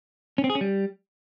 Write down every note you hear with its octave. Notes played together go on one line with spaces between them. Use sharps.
C#4
C4
G#4
C#4
G3